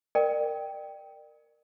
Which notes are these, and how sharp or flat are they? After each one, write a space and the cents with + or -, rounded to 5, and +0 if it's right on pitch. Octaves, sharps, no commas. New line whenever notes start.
A#4 -10 D5 +35 G5 +0